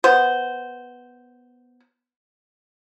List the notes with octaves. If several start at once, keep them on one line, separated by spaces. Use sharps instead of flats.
B3 C5